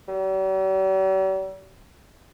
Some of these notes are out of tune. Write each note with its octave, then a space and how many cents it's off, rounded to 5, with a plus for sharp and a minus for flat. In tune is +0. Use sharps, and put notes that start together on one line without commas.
G3 -45